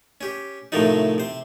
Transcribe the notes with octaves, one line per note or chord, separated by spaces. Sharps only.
C#4 G4
A2 C3 D#3 F3 F#3 D#4
C3 C5